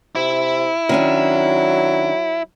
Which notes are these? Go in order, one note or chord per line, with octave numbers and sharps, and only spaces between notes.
C3 E4
D#3 F#3 C#4 D4